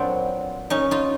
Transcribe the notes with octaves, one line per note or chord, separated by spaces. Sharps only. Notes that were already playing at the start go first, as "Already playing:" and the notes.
Already playing: A#2 F#3 B3 C4 D4
C#4 D#4
D#4 F4